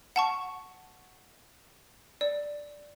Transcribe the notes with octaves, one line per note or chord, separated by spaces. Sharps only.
F#5 A5 C#6
D5